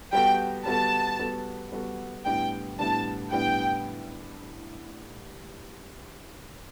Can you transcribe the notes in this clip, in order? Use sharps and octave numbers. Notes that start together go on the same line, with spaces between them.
G3 B3 F#4 A4 G5
G3 B3 F#4 A4 A5
G3 B3 F#4 A4
G3 B3 F#4 A4
A2 G3 B3 D4 G5
A2 G3 B3 D4 A5
A2 G3 B3 D4 G5